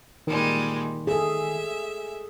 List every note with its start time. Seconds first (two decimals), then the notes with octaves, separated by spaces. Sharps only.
0.27 A#2 D#3 G3 G#3
1.07 G#4 A4 E5